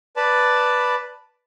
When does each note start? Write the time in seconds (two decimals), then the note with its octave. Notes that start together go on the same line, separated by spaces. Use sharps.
0.16 B4 D5 A5 B5